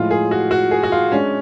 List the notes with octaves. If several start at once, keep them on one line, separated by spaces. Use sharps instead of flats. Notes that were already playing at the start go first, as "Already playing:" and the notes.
Already playing: A2 F3 G#3 F4
G#4
F#4
F#4
G#4
F#4
F4
G#3 C#4 D4 G#4